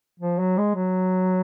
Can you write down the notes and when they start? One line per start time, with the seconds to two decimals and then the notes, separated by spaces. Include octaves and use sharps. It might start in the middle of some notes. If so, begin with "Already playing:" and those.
0.20 F3
0.39 F#3
0.58 G#3
0.75 F#3